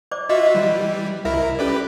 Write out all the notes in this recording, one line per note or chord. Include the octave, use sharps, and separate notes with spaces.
C5 D5 D6
F4 F#4 D#5 E5
E3 G3
C2 E4 A#4 E5
C#4 G4 A4 B4 D5